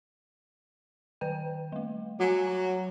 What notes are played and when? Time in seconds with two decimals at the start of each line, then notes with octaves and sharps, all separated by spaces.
1.21 D#3 B4 G5
1.72 G3 A3
2.20 F#3 F#4 G#5
2.47 A#5